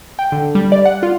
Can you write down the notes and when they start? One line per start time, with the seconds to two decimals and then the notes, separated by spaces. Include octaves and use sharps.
0.19 G5
0.32 D3
0.55 G3
0.72 D5
0.85 F#5
1.03 F4